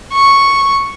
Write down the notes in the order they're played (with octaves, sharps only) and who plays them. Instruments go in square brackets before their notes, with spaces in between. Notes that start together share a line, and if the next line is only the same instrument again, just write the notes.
[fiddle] C#6